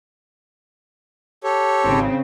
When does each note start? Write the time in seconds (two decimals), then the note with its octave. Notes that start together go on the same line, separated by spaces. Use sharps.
1.44 G4 A4 C#5
1.85 G#1 C#3 C4